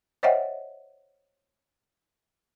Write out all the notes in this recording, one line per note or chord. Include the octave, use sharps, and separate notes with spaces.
C5 C#5 D#5 E5 F#5 G5